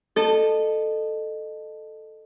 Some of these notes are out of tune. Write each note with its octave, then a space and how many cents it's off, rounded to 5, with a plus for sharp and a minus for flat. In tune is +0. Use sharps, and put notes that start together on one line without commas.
A4 +0 D#5 -25